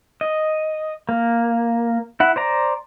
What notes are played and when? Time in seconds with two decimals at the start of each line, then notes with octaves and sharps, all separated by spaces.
0.21 D#5
1.09 A#3
2.20 E4 F#5
2.36 C5 D5 A#5